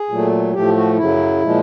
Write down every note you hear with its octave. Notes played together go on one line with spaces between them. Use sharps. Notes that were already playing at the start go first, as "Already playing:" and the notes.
Already playing: G#4
A#2 F#3 A3
A2 F3 A3 G4
F#4
F#2 C#3 F#3 E4
A#2 F3 G#3